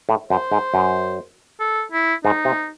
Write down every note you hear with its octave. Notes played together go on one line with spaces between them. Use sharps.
A2
F#2 C5
G#2
F#2
A4
E4
G#2 D#4
C3